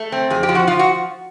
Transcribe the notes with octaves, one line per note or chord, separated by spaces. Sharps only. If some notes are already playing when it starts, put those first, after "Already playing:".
Already playing: A3
C4
F2 G#4
G4
F3
F#4
F3 F4
F#4